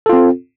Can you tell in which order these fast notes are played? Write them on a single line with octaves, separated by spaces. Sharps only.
A4 F4 C4